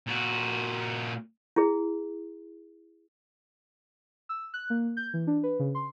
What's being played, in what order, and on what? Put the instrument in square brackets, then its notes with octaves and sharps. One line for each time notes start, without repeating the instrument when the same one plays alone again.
[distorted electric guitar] A#2 F#4
[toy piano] E4 G#4
[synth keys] E6
F#6
A#3
G6
E3
D4
B4
C#3
C6